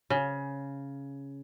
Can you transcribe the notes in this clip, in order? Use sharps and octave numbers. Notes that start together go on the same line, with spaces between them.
C#3